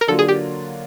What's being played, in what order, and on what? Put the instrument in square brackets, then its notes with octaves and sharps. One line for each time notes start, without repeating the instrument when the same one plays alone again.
[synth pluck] A#4
[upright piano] D3 F#3 A#3 D4 F4 [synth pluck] A4
[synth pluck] G#4
G4